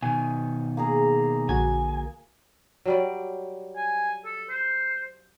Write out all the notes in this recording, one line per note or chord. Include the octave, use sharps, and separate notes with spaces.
B2 D#3 G#5
A#3 G#4 A#5
A#1 D3 F#4 G#5
F#3 G3 D5
G#5
A4
C5